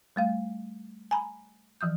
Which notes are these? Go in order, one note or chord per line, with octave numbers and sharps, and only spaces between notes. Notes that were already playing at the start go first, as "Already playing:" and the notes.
G3 A3 F5
G#5 A#5 B5
E3 F3 D#6 G6